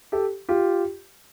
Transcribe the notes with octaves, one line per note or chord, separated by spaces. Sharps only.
G4 A4
F4 G4